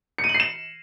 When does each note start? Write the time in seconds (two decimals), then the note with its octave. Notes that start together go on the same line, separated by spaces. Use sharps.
0.18 C#7
0.24 D#7
0.29 F#7
0.34 C7
0.40 E7